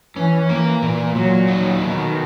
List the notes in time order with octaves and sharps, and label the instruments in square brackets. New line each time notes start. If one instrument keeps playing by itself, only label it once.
[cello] E3 [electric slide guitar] C#4
[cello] E3 [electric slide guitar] A#3
[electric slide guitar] A#2
[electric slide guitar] A#2 [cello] F#3
[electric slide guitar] D#4
[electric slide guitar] B2 [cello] D#3